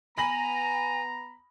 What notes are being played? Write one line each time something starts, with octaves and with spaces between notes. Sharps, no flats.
B3 G#5 A#5 B5 A#6 F#7